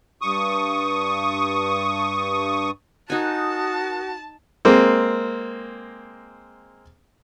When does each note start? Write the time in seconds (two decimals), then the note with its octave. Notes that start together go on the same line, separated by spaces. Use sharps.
0.22 G2 C#6 D#6
3.10 D#4 F#4 A#4 G#5 A5 D#6 F#6
4.65 G#3 A#3 C4